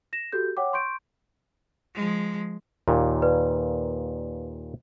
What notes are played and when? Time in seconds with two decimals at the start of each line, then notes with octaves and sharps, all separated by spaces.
0.13 A#6 E7
0.32 F#4 G4 A4 G6
0.57 C#5 F#5 G5 D6
0.73 C6 C#6 G6 D7
1.95 F3 G#3
2.88 D#2 A#2
3.22 B4 D5